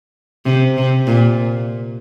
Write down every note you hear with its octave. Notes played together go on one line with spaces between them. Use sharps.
C3
C3
A#2